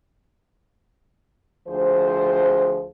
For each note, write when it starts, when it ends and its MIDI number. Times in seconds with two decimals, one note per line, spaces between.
1.68 2.87 38
1.68 2.87 53
1.68 2.87 68
1.68 2.87 72